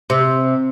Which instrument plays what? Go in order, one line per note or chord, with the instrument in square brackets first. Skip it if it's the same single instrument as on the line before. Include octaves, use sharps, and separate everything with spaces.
[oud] C3